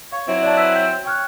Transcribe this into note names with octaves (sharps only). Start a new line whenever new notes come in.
C#5 F5
F#3 C4 E4
D4 D5 A5
B4 E6
G5
C#5 G5 F6 F#6